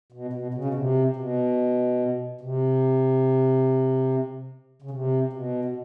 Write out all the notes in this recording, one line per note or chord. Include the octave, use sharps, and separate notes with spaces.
B2
B2
C#3
B2
C3
B2
C3
C#3
C3
B2
B2